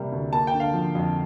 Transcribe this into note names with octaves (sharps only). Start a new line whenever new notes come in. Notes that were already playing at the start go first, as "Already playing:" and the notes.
Already playing: C3 G3 A#3
D2
A#3 A5
G5
D3
F5
F3
F2